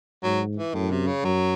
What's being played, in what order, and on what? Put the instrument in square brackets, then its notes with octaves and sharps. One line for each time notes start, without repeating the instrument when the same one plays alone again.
[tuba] G#2 [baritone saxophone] F#3
[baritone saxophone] E3
[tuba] F#2 [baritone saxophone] A2
[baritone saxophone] C3
C#3
[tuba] F#2 [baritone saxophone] F#3